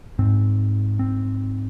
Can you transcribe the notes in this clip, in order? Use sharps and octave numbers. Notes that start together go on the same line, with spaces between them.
G#2 C4
C4